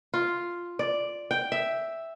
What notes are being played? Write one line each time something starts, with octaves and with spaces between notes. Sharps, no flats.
F4
D5
G5
E5